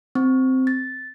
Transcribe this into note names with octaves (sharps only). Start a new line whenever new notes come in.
C4
A6